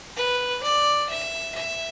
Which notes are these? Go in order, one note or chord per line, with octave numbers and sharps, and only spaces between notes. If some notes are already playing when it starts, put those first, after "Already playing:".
B4
D5
E5
E5